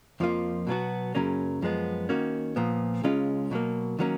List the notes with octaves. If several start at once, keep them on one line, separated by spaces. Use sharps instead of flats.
F2 F3 A#3 F4
B2 F#3 B3 F#4
F#2 C#3 F#3 A#3 C#4
F#2 F3 G#3 B3
D#3 A#3 C#4 F#4
A#2 F3 B3
C#2 C#3 G#3 C#4 F4
B2 F#3 A#3
D#3 F#3 A#3 C#4